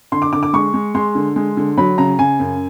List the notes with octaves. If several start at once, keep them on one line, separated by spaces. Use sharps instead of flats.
D3 C6
D6
D3 D6
D6
G#3 C#6
G#3
G#3 C6
D3
G#3
D3
F#3 B5
C#3 A#5
C#3 G#5
F#2